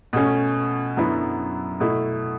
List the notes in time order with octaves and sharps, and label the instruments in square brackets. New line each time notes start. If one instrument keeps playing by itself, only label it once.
[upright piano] B2 A3 C#4
F#2 D3 F#3 B3 E4
B2 A3 E4